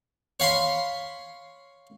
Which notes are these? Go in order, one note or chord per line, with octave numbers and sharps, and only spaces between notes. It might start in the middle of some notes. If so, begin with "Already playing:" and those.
C#5 F5 B5 C6